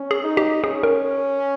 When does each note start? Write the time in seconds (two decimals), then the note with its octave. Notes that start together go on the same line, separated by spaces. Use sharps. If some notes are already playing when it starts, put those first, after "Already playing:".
Already playing: C#4
0.11 G#4
0.23 D#4
0.37 G4
0.64 C#4 G#4
0.83 A#4